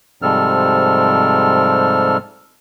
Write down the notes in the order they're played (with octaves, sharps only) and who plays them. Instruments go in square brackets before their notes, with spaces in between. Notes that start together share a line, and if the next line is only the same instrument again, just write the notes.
[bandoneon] G#2 C3 F3 G3 A4 F6